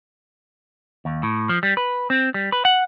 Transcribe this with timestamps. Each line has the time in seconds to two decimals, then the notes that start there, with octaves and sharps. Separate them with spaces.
1.05 D#2
1.23 A2
1.49 F3
1.63 G3
1.77 B4
2.10 C4
2.34 G3
2.52 B4
2.65 F#5